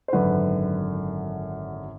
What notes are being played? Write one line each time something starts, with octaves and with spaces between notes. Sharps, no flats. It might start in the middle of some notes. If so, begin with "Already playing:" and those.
C5
G#1 F#2 D3 B4